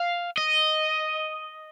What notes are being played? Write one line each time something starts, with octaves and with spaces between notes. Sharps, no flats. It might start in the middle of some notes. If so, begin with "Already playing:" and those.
Already playing: F5
D#5